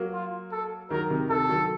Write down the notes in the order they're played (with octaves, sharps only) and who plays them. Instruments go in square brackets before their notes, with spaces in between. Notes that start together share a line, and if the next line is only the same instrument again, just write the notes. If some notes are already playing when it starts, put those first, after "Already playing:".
Already playing: [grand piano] F#3 A#3
[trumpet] F4
A4
[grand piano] D#3 F#3 [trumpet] A#4
[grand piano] C3 D#3
[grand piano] C3 D#3 [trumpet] A4
[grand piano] D#3 F#3